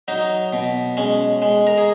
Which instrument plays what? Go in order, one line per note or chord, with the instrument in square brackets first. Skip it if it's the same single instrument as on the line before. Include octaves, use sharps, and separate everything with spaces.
[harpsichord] F#3 D#4
B2
G#3 C#4
G#3
A#4
G#4